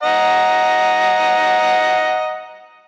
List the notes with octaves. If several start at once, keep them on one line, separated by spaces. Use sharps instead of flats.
D#5 F#5 A#5